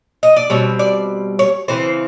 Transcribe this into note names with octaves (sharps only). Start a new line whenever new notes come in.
D#5
D5
B2 G3 C4 C#5
D5
C#5
C#3 E3 C4 C5